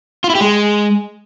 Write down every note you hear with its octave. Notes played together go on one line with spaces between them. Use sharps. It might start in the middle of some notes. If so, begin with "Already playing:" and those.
F4
E4
G4
G#3